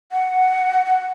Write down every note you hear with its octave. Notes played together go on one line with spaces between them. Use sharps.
F#5
F#5